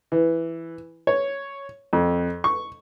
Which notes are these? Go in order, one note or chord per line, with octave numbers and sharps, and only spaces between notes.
E3
C#5
F2
C#6